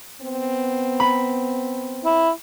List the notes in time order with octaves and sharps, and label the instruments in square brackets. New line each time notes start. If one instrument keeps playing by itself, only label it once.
[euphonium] B3 [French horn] C4
[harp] B5
[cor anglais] E4